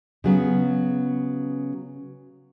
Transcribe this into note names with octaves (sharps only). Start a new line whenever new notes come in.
C#3 F#3 B3